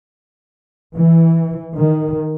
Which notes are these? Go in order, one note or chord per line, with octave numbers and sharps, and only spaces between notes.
E3
D#3